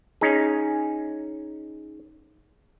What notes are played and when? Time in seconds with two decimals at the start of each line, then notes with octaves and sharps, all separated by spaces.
0.21 C#4 D#4 G#4